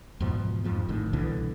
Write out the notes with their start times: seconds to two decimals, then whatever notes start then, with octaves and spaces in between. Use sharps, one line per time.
0.20 E2 G#2 B2 F3
0.64 F2 G#2 F3
0.89 G#1 A2 D#3
1.13 C2 B2 D3 E3